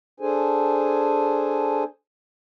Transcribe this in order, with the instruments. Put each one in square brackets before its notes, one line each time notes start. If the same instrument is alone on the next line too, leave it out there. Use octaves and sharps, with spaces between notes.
[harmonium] D4 G#4 A4 C5 G#5